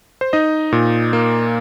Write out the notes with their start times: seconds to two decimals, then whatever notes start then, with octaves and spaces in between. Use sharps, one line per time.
0.21 C5
0.33 D#4 D#5
0.72 A#2
1.13 A#3